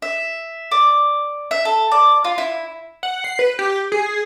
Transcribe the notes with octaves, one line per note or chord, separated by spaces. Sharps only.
E5
D5
E5
A4
D5
F4
E4
F#5
C7
B4
G4
G#4